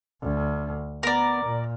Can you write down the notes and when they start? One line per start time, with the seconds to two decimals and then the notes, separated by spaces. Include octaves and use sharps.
0.22 D2
1.03 B3 A#4 D5
1.45 A#2